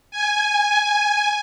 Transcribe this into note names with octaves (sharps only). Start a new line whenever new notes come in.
G#5